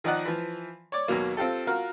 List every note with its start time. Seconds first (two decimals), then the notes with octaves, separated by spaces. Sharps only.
0.04 D#3 F3 D#4 D5 D#5 F#5
0.25 E3 F3
0.92 C#5 D5 D6
1.08 D#2 B2 F#3 A#3
1.37 C4 F4 G4 A4
1.67 F4 F#4 A#4 F5